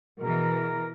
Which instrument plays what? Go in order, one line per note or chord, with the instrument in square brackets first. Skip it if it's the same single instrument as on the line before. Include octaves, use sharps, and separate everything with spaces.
[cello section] B2 E3 [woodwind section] G#4 A#4